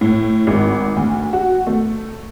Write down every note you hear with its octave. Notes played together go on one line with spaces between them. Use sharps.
A2
G#1
D2
F#4
A3